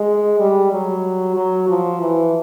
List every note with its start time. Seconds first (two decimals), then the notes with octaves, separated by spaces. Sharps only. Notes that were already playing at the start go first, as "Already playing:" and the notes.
Already playing: G#3
0.40 G3
0.72 F#3
1.37 F#3
1.69 F3
2.01 E3